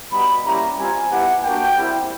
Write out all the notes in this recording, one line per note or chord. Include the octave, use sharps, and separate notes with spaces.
G3 B3 D#4 F#4 B5
G3 A#3 C#4 E4 G4 A#5
G3 C4 F4 G#5
G3 B3 E4 G4 F#5
A#3 D4 F#4 G5
G3 C4 E4 G4